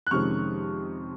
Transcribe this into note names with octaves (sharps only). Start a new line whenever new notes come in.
F#6
F2 C3 D#3 G#3 C#4 C#6 F6